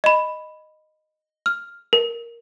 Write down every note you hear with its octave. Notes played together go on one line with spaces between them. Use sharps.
D#5 B5
F6
A#4